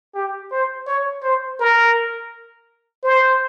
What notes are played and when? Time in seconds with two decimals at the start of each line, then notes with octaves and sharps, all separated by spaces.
0.15 G4
0.51 C5
0.87 C#5
1.23 C5
1.59 A#4
3.03 C5